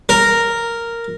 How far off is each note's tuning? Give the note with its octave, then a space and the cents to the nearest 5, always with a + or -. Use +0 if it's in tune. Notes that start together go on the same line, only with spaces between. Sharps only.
A#4 -5